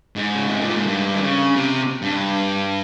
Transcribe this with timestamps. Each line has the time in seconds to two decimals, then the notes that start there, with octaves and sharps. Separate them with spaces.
0.16 G#2
0.36 C#3
0.48 C3
0.61 A#2
0.74 G#2
0.86 G2
1.14 D#3
1.21 C#3
1.56 C3
2.02 G2